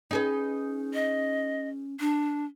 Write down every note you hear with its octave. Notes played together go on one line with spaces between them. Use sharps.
C#4 D#4 G#4 B4
D#5
D4